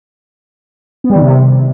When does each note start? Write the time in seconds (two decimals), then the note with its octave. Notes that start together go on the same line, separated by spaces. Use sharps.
1.04 B3
1.10 G3
1.16 D#3
1.21 C3